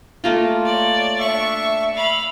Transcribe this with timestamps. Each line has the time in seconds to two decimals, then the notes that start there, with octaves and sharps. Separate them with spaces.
0.24 A3 A#3 F4
0.65 C#5 D5
1.19 D4 E5 C#6
1.94 F5 B5